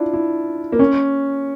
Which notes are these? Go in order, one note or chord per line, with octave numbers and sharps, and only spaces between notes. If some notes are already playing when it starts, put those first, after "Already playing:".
Already playing: D4 E4 F4
E4
A#3
C#4